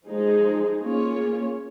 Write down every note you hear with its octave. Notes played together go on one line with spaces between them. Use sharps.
F3 G#3 D#4 G#4
A#3 C#4 F4 G#4 C#5